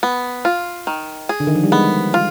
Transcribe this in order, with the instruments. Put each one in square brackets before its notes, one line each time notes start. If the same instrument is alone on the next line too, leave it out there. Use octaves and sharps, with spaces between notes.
[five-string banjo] B3
F4
D#3
G#4
[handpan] D3
D#3
F3
G3
[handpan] G#3 [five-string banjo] B3
[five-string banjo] F4